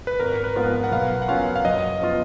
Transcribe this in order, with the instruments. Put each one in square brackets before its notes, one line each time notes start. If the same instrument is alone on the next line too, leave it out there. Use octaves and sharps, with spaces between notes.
[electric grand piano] B4
[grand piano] G#1 [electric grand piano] A#4
[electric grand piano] B4
[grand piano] G#2 F3 B3 F4
[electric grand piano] F#5
[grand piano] B1 [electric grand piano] F5
[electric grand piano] F#5
[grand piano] B2 F#3 C#4 F4 [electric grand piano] F5
[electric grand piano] F5
[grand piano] F#1 [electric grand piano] D#5
[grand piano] F3 B3 F4